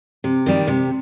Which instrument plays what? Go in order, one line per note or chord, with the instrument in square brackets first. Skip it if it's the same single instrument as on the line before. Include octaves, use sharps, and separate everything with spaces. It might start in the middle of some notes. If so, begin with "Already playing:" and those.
[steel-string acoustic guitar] C3
D#3 G3
C3